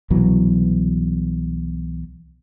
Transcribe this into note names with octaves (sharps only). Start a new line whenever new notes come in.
C2 B2 E3 F#3